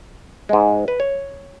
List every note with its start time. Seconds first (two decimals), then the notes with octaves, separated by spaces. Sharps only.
0.49 G#2 G#3
0.88 B4
1.00 C#5